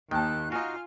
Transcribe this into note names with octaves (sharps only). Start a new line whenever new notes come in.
D#2 D#3 G5 A5 F#6
D#4 F4 F#4 G#5 F6